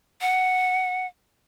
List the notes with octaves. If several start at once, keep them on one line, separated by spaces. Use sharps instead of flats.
F#5